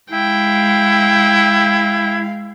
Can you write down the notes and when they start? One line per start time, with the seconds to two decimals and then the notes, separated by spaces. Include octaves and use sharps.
0.12 G#3 E4 F5 G5